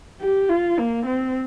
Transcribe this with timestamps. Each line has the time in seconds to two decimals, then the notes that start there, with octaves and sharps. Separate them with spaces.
0.21 G4
0.49 F4
0.78 A#3
1.06 C4